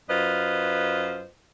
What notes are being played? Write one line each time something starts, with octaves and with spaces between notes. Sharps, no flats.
F#2 F4 B4 C5 D#5